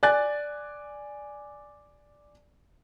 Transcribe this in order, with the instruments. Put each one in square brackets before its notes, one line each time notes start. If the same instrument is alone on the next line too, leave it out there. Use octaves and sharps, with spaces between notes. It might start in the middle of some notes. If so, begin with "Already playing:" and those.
[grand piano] D5 G#5 F#6 A6